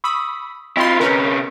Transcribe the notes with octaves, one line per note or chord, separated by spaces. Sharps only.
B5 C#6 D#6 E6
C4 E4 F4 D#5 B5 C6
C3 C#4 A#4 B4